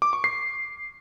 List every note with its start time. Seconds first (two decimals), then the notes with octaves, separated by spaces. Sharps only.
0.02 D6
0.13 C#6
0.24 C7